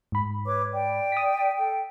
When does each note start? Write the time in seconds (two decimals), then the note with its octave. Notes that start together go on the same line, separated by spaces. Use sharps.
0.12 G#2 B5
0.45 B4 C#5 D6
0.72 D5 G5
1.12 D#6 B6
1.57 A4 G5